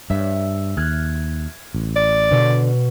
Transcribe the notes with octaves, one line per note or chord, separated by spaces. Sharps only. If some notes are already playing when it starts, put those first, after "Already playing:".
G2 E5
D#2 F6 F#6 G#6
A1
D5
B2 D3